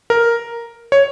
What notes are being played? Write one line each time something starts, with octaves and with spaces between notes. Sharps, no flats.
A#4
C#5